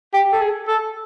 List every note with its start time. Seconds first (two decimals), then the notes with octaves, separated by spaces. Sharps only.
0.14 G4
0.32 A4
0.41 G#4
0.68 A4